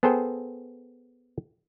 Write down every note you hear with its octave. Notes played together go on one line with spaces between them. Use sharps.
B3 G#4 A4 C5 G5